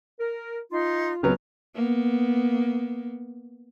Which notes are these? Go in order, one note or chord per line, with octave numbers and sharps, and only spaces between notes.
A#4
D#4 F4 C6
C#2 C#3 F#3 B3 F6
A#3 B3